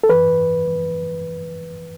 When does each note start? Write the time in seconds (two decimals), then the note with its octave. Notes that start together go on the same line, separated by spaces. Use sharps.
0.03 A4
0.09 F#2 E3 B4